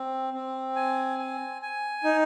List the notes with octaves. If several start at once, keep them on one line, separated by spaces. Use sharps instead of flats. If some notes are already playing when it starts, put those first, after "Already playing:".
Already playing: C4
C4
G#5
G#5
G#5
D#4